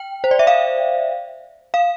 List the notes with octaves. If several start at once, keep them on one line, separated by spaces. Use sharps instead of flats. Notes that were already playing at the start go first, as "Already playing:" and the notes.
Already playing: G5
C5
D5
E5
F5
F5